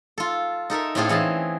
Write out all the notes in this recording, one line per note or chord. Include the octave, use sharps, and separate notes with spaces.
F4 A4
D#4 A4 A#4 E5
A2 C4 C#4 F4 G#4 A4
E3 G#4 D#5 A5